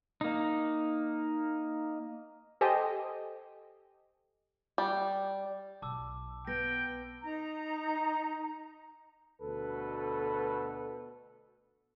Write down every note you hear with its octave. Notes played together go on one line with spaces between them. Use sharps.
A#3 D#4
G4 A4 C5 D#5 G5 G#5
G3
B1 A5 D6 E6
B3 G5 A#6
D#4 A#5
D2 B2 A4 B4